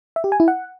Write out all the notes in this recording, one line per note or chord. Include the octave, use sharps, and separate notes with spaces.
E5
G4
G#5
E4
F#5